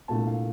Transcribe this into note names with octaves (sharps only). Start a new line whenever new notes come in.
C2 A#2 A3 D4 A5
F5